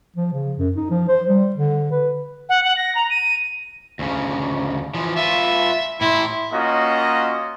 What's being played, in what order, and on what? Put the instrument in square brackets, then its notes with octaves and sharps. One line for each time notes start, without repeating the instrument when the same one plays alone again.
[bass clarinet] F3
C#3
F#2
D#4
F3
C5
G3
D3
B4
[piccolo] F#5
F#5
A#6
A#5
D#7
[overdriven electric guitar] D2 C#3
E3 F3
[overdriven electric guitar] F4 B4 [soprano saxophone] E5
[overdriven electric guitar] A2 C6 [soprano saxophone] E4
[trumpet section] A#3 C#4 F4 F#4 D#5